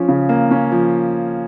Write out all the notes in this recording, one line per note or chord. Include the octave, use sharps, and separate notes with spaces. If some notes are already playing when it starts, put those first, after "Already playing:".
Already playing: F3 C#4
C#3
A#3
C#4
F3